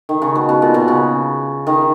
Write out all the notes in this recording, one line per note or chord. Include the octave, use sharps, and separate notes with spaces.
D#3
C#3
B2
B2
A#2
B2
C#3
D#3